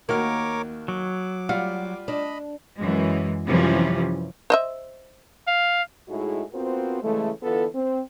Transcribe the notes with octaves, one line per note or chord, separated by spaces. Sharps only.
D#2 A#3 F#4 A#4 C#5 D6 F6
F#3 D6
G3 F4 F#4 F5
D4 D#5 B5
F#2 E3 G#3
F#2 C3 E3 F3 G3 C#4
C5 D#5 E5
F5
A2 G#3 D#4 E4 F#4 G#4
B3 C4 F4 F#4 A#4 C5
C#3 E3 G#3 A3
D3 E3 B3 F4 A4
C4